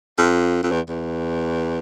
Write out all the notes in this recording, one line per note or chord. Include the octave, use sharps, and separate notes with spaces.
F2
F2
E2
E2